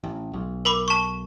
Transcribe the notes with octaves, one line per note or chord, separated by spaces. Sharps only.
A1
B1
A#4 B5 D6
A5 C#6